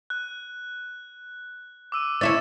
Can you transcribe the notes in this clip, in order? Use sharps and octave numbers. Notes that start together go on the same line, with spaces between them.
F#6
D6 E6 D#7
C#4 E4 C#5 A6 E7